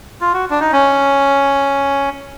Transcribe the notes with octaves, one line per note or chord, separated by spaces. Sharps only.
F4
F#4
D4
D#4
C#4